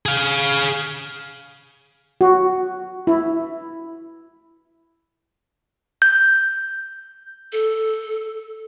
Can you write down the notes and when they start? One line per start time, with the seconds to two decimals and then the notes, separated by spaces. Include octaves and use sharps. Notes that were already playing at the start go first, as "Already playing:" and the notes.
0.06 G#4 F5
2.21 F#4
3.07 E4
6.02 G6
7.52 A4